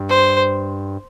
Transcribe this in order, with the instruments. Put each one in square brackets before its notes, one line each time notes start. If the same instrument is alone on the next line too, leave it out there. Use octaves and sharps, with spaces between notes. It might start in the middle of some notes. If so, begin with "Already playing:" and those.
Already playing: [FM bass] G2
[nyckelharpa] C5